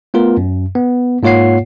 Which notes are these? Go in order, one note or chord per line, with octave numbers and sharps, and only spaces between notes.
A3 B3 F4 A#4
F#2
B3
G#2 A#3 F4 C#5 F#5 C7